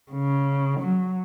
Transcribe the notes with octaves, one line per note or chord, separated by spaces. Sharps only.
C#3
F#3